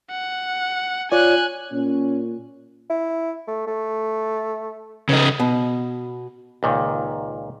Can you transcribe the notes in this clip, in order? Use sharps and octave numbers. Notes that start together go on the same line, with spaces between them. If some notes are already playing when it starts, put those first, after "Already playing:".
F#5
F4 C#5 D5 G#5 F#6
A#2 C#4
E4
A3
A3
C#3 B3 D#4
B2
C#2 A#2 D#3